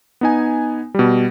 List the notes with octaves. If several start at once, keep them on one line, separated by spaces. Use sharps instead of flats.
B3 D#4 G#5
B2 G3